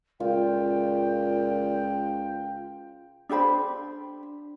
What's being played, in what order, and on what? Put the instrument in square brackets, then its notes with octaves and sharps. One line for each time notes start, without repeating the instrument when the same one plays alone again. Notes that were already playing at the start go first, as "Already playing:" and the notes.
[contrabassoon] C#2 [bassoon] A#2 [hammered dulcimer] F4 [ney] G5
[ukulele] D4 G4 C5 B5